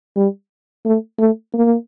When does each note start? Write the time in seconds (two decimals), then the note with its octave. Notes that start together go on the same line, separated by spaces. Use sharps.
0.16 G3
0.85 A3
1.19 A3
1.54 A#3